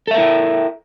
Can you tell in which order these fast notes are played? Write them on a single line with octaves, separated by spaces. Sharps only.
A4 E5 A#4 E4